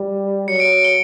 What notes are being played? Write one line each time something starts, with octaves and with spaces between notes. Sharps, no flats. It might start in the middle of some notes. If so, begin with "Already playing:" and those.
Already playing: G3
F#3 C#7
D7
D7
G7